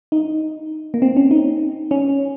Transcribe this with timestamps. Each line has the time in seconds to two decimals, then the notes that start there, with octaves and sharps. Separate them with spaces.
0.12 D#4
0.94 A#3
1.02 C4
1.17 C#4
1.31 D#4
1.91 C#4